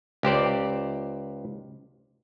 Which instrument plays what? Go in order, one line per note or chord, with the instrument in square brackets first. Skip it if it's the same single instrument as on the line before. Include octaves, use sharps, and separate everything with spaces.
[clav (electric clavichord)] C#2 G4 C5 D5